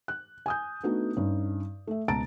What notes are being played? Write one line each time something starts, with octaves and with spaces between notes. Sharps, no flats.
F#6
G#5 D#6 G6
A3 B3 D4 D#4 F#4
G2 C#4 D#4
A3 E5
C#2 B2 A5 A#5 A6 D7